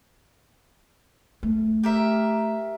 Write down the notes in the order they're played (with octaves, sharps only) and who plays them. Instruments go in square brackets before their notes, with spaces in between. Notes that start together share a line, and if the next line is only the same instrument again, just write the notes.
[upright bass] A3
[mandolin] G4 A#4 E5